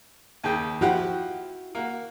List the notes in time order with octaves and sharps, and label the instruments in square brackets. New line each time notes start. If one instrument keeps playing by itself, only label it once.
[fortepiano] D#2 C#3 G5
[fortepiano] F3 G4 F#5 [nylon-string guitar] E4 F#4
[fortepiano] A#3 F#4